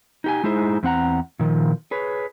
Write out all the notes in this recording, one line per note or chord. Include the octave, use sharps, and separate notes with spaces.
D#4 G4 G#5
G#3 D#4 E4 G#4 C5
E2 C4 F#5 A#5
A#2 D#3 F3
G#4 B4 C#5